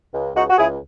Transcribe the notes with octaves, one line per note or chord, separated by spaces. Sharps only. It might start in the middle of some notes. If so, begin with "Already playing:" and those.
C#2
C#2 D#4 F#4
F#4
C#2 E4 G#4